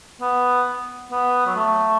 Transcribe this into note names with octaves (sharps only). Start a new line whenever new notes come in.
B3
B3
F#3
A3